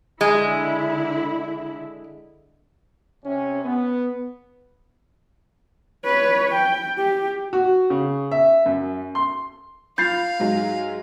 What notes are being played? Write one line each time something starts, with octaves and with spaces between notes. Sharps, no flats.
D3 G#3 E4
C3 C#4
B3
B4 C#5
G5
G4
F#4
C#3
E5
F#2
C6
F4 F5 B5 G6 A6 C7
G#2 F#3 G#3